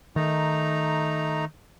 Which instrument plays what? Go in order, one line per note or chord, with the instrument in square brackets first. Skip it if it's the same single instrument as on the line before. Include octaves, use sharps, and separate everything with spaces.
[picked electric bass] D#3 [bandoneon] A3 D#4 A#5